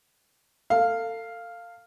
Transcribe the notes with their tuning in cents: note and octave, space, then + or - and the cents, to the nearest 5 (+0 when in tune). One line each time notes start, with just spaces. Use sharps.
A4 +35 F5 -5